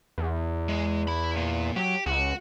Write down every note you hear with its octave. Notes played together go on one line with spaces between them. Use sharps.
E2
G#3
E4 B5
A#2
F#3 G4
C#2 F#4